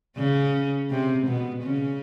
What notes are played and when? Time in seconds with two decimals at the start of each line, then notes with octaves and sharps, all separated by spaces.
0.17 C#3 C#4
0.90 C3 C4
1.27 B2 B3
1.63 C#3 C#4